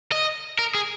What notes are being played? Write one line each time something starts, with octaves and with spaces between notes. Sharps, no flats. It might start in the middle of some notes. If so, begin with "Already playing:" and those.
D#5
A#4
G#4